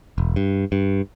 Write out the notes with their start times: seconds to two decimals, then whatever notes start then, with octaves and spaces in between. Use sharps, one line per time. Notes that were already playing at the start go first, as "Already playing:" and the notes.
0.18 E1
0.36 G2
0.72 G2